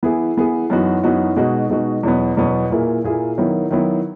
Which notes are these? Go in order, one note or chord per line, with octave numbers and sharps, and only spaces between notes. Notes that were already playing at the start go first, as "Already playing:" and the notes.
E3 B3 E4 G#4
E3 B3 E4 G#4
F#2 E3 B3 D#4 F#4
F#2 E3 B3 D#4 F#4
B2 G#3 D#4 F#4
B2 G#3 D#4 F#4
E2 B2 F#3 B3
E2 B2 F#3 B3
A#2 A#3 E4 G#4
A#2 A#3 E4 G#4
D#3 F#3 B3 E4
D#3 F#3 B3 E4